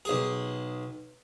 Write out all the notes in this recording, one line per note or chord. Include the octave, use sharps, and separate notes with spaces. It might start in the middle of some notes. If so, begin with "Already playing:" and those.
B1 G#4